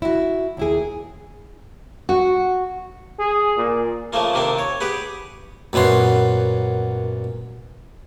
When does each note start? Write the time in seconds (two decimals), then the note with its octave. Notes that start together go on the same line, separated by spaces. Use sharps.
0.02 E4 F#4
0.57 D#2 E4 G#4
2.09 F#4
3.19 G#4
3.57 A#2
4.13 C#3 F3 A3 A#3 F4
4.34 C3 D#3 A#3 C4 D4
4.59 C#5
4.80 G4 G#4 B4 F#5
5.73 F#2 A#2 B3 C#4 C6